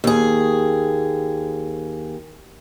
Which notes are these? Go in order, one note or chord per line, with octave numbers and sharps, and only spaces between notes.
D#2 G#4